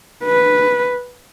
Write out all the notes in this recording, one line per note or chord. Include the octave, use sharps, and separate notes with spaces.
B4